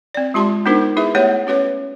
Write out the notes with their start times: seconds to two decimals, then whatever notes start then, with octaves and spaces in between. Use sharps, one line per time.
0.15 C4 D5
0.34 G#3 F4 G4 A5 C6
0.66 B3 D4 D#4 F#4 A#4 C5
0.97 E4 G#4 B4 E5
1.15 A3 B3 G4 C#5 E5 F#5
1.47 C#4 F#4 B4 C#5